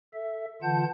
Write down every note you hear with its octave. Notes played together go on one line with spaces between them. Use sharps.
A4 E5
D3 E3 F4 F#5 A5 G6